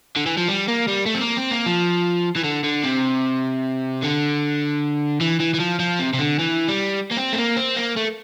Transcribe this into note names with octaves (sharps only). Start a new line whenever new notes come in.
D3
E3
F3
G3
A#3
G3
A3
C4
A#3
C4
A#3
F3
E3
D3
D3
C3
D3
E3
E3
E3
F3
F3
C3
C3
D3
E3
G3
A#3
C4
A3
A#3
C4
A#3
A3